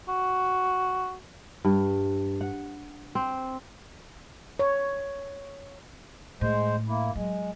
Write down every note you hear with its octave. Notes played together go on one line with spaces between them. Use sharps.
F#4
G2
F#5
C4
C#5
A2 G#3 C5
A#3 E4
F#3 G#3